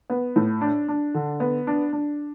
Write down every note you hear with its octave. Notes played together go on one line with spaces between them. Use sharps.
B3
A2
D4
D4
D3
B3
D4
D4